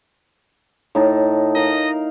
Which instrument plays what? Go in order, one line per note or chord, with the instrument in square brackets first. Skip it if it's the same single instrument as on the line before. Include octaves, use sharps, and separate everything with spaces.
[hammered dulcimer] A2 D#4 A5
[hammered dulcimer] A#4 F5 [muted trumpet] D#5